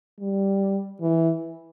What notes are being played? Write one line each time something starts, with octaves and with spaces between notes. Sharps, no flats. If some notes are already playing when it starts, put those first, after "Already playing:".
G3
E3